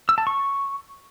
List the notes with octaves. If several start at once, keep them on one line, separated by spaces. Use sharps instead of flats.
E6
A5
C#6